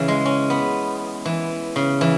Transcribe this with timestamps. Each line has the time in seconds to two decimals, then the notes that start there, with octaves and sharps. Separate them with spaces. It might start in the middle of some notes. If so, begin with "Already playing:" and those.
Already playing: C#3 E3
0.08 G#3
0.26 C#4
0.50 B3
1.26 E3
1.76 C#3
2.01 E3